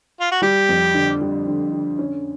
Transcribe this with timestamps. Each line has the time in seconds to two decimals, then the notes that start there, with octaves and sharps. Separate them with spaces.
0.20 F4
0.32 F#4
0.42 G3 G4
0.69 F2
0.94 D3
1.21 G3
1.47 D3
1.72 D3
1.99 C#4